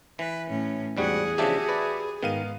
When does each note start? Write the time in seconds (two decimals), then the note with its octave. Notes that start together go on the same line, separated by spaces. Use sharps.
0.19 E3 B4
0.49 A2 C#4
0.97 E2 G#2 G3 F#4 G#4 F#5
1.38 C#3 F3 D4 F#4 G4 E5 A5
1.69 B4 D5
2.23 G#2 D#3 B3 F5 D#7